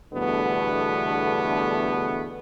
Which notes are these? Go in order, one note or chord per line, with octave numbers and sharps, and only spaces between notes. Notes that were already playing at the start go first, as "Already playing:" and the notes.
E2 G2 B2 D3 A3 B3